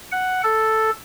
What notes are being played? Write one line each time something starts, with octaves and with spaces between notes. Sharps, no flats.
F#5
A4